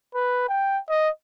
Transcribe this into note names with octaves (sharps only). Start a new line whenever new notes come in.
B4
G5
D#5